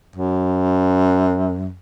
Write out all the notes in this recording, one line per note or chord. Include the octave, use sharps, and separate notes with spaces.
F#2